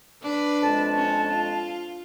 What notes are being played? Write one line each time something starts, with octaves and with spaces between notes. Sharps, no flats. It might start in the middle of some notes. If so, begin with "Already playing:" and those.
D4 B4
F2 G#3 A5
C#4
F4